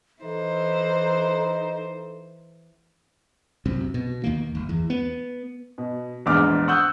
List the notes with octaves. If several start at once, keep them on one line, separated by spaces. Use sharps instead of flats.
E3 D#4 A4 C5
C2 F#2 C3
B2
D#2 D#3 A#3
G1
E2
B3
B2
A#1 E2 G#2 D6 F6
F#5 C#6 D#6 E6 F#6 G6